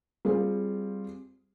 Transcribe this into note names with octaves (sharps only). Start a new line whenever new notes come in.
G3 C4 F4 G#4